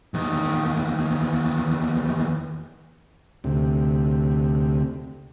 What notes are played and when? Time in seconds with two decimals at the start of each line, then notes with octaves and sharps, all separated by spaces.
0.14 E2 D#3
3.44 D2 C3